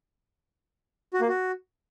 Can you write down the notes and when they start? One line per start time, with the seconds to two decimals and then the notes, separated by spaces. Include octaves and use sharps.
1.14 F#4
1.21 A#3
1.29 F#4